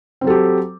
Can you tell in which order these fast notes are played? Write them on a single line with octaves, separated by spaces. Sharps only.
C4 F#3 A4 G4